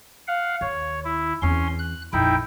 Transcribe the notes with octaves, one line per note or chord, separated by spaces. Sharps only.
F5 F#5
D#2 C#5
E4
E2 C4 C#4 C6
F#6
A#1 F2 D#4 E4 G5